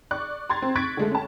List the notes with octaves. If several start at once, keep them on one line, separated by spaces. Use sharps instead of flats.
D5 C#6 F#6
A#5 C6 G#6 A6
C4
C#6 F#6 G#6 A6 B6 D7
D3 G#3 A3
C#4 A5